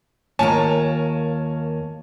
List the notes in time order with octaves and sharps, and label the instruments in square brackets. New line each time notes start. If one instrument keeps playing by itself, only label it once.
[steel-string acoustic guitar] D#2 F4 A#4 [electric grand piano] C#5 G#5 A5